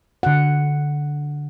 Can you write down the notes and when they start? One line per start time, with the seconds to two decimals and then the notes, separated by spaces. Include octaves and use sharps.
0.23 D3 F#5